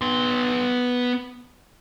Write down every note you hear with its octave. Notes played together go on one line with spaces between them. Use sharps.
B3 C6